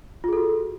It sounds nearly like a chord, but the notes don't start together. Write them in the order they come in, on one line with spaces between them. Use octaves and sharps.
F4 G#4 A4 F#4